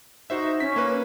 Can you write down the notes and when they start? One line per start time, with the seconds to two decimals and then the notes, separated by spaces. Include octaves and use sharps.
0.30 D#4 F#4 C5 E5
0.60 C#4 B6
0.76 A#3 B4